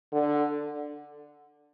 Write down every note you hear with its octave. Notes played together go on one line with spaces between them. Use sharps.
D3